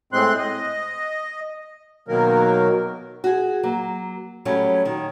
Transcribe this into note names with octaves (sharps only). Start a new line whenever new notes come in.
A2 G#3 C4 C6 F#6
D#5
B2 D#3 F#3 A#3 A#4
F#4 G#4
F#3 A#3
A2 F#3 G3 C#4 A4
D#3